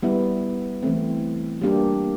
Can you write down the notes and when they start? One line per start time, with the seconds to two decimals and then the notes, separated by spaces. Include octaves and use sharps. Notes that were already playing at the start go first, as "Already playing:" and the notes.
0.03 G3 B3 E4
0.83 E3 A3 C4
1.61 G3 A#3 D4 G4